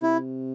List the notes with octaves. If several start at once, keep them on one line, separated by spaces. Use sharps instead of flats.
C3 E4